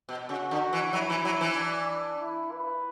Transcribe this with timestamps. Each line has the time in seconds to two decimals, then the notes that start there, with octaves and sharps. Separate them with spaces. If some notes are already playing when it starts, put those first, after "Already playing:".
0.09 B2
0.29 C#3 F#4
0.51 D3
0.73 E3
0.93 F#3 E4
1.10 E3
1.25 F#3
1.41 E3
1.57 D4
2.21 E4
2.52 B4